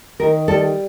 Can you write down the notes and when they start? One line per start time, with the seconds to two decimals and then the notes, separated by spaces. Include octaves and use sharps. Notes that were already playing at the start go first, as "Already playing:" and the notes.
0.20 D#3 A#4
0.48 G3 A4